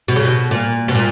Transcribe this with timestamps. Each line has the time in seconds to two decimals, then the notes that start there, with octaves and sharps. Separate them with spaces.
0.08 B2
0.16 C#3
0.24 B2
0.51 A#2
0.88 B2
0.95 A#2